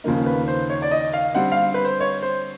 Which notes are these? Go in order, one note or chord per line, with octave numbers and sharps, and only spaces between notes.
D#2 C#3 F3 A#3 D#4
B4
C5
C#5
D5
D#5
F5
D3 G3 C4 F#5
F5
B4
C5
C#5
C5